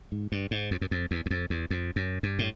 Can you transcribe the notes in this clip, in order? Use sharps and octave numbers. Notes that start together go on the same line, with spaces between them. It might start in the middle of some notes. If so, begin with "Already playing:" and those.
G#2
G2
G#2
F2
F#2
F2
E2
E2
F2
E2
F2
F#2
G2
A2